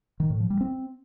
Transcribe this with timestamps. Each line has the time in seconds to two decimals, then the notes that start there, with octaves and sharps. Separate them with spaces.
0.20 D#3
0.30 A2
0.40 F3
0.50 G3
0.61 C4